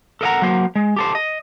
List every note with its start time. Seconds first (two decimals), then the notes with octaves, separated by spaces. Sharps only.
0.21 A4 A#4 D#5 F5 F#5 A#5
0.42 F#3 A#3 C5
0.75 G#3
0.96 G4 A4 C5
1.15 D#5